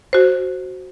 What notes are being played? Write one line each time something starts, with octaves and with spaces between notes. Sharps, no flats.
F#4 C5